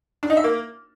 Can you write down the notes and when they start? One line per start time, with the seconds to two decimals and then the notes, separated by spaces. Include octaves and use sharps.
0.23 D4
0.30 D#4
0.37 E5
0.44 A#3